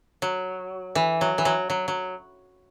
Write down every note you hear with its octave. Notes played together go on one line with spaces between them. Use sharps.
F#3
E3
F#3
E3
F#3
F#3
F#3